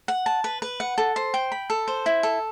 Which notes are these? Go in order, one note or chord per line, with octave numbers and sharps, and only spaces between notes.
F#5
A5
B4
B4
F#5
A4
C5
G5
B5
A4
C5
E4
A4